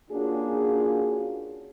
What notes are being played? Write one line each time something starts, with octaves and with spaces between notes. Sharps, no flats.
A#3 C#4 D4 F4 F#4 G#4